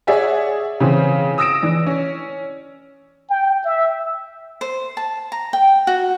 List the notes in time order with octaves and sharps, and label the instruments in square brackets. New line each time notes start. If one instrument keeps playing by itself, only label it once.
[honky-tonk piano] G#4 C#5 D5 E5 F#5 G#5
C#3 E3 C4
D#6 E6 A#6 D7 E7
E3 D4
C#4
[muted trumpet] G5
E5
[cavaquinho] C5
A5
A#5
G5
F#4